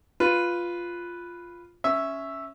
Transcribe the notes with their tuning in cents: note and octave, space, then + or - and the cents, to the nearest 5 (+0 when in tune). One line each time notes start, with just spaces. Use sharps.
F4 +0 B4 +0
C#4 +0 E5 +0